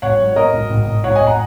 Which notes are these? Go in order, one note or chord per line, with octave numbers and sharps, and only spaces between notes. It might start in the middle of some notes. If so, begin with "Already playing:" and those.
G#1 C#5 F#5
F#3
C#5
F#2 A#4 D#5
G#1
G#1
G#1
G#1 C#5 F#5
D#5 G#5
G#1
F#5 A#5